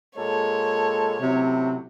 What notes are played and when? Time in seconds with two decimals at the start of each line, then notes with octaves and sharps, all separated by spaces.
0.16 A#2 G#3 A4 C#5
1.22 A1 A2 C3 F#3